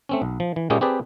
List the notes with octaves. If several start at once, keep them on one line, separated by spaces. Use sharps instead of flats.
A3 C4 C#4
B1
F3
E3
A#2 G#3 A#3 C#4 G4 G#4
C4 G4 G#4 B4 D5 A5